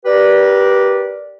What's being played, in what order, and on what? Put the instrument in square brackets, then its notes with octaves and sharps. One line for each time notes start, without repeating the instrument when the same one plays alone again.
[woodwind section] G4 A#4 B4 D5